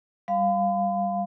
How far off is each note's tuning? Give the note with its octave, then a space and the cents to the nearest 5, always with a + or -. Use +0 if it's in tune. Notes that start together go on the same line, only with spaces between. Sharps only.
G3 +0 F5 +0 B5 +45